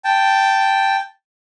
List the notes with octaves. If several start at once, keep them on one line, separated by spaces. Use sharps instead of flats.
G5 A5